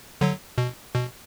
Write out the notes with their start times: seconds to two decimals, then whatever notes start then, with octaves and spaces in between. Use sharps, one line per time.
0.21 D3 F#3
0.58 B2
0.95 B2